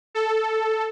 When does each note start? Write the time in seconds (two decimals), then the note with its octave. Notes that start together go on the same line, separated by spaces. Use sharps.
0.15 A4